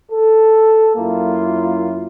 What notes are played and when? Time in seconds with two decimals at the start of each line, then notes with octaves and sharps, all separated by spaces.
0.11 A4
0.96 F#2 A#3 E4 F4